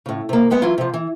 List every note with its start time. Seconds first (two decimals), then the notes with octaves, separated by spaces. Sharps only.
0.06 A2 C#3
0.29 C3 A#3
0.50 G3 G#3 B3 F#5
0.62 E3 F#3 E4 F4
0.78 C3 F3
0.94 E3